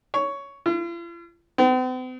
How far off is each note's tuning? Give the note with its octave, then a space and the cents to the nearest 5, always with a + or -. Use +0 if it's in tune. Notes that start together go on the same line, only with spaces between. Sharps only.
C#5 +10
F4 -45
C4 -45